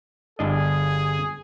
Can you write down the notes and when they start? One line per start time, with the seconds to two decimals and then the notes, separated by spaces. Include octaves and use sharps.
0.39 G1 D4 G#4 D#5